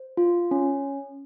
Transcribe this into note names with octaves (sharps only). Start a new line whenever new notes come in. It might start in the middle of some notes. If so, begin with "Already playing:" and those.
Already playing: C5
F4
C#4